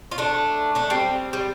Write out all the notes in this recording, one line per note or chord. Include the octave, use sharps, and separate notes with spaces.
F4
A3 D4
A3 D4
G3 C4
G3